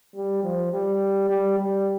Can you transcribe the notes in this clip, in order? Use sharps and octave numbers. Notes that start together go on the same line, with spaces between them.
G3
F3
G3
G3
G3